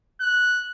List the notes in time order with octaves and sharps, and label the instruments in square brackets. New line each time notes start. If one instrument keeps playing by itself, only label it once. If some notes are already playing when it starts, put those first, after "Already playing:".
[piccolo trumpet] F#6